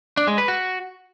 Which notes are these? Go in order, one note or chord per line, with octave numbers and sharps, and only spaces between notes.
D4
G#3
B4
F#4